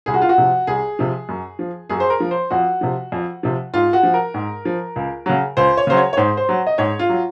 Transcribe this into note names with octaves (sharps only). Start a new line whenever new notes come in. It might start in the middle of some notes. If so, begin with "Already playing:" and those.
C2 G#4
F#4
F4
F#4
C3 F3
C2 G#4
C3 F3
F#2
F3
F#2 G#4
C5
A#4
F3
C5
F2 F#4
C3 F3
F2
C3 F3
G#2 F4
F#4
F3
A#4
G#2
F3
C#2
C#3 F#3
C#2 C5
C#5
C#3 F#3 C5
C#5
C#5
G#2 C5
C5
F#3
D#5
G#2 C#5
F4
F#3